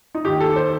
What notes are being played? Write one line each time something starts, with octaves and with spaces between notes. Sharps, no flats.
D#4
D#2 D#3 G4
A4
C5